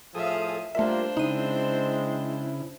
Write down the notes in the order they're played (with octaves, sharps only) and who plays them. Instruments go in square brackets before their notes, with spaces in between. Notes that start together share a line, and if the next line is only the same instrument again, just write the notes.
[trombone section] A2 F3 [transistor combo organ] G#4 A4 D#6 [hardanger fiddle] E5 F5
[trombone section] G3 A#3 F4 [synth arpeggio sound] A3 E5 [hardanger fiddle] D4 C5 [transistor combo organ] A#4
[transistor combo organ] C#3 E4 [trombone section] G#3 C4 [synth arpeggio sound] D#4 D#7